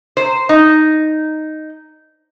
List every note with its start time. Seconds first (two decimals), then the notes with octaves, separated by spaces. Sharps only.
0.17 C5
0.49 D#4